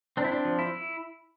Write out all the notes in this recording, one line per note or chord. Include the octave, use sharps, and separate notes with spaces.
C4 D4
E4
D4
F3
E4